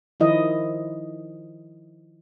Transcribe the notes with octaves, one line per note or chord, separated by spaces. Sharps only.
D#3 F3 E4 D#5